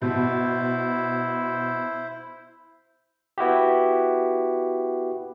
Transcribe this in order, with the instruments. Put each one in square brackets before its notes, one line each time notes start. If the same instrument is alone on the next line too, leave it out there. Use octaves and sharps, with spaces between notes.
[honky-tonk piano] B2 [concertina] E4 C5
[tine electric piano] B3 E4 F#4 G4